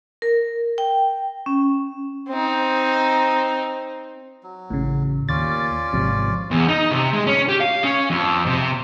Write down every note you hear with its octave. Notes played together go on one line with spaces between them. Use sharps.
A#4
G5
C#4
C4 D#4
F#3
A1 A2 C#3
D#2 C#4 F4 D5 A6
G#1 C3 F3
E2
D#4
C3
G#3
C#4
G4
F5
C#4
F2
C3